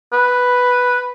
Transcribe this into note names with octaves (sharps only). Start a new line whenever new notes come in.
B4